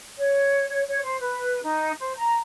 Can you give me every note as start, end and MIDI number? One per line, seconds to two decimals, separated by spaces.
0.18 0.68 73
0.69 0.83 73
0.87 1.02 73
1.04 1.20 72
1.20 1.62 71
1.62 1.92 63
2.00 2.12 72
2.17 2.39 82